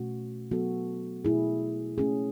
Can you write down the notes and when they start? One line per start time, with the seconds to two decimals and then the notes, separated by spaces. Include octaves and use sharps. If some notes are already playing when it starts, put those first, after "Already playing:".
Already playing: B2 A3 C#4 F#4
0.51 F#3 B3 F#4 A4
1.25 B2 A3 E4 G#4
1.98 A3 C#4 G#4